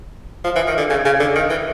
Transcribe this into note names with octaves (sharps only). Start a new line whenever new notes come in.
F3
E3
D#3
D3
C#3
C#3
D3
D#3
E3